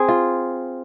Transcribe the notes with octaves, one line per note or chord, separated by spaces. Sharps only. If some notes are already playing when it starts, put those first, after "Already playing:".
Already playing: C4 G#4
F4